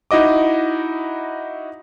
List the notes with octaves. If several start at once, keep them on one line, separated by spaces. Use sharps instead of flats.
D#4 E4 F#4 D#5 D6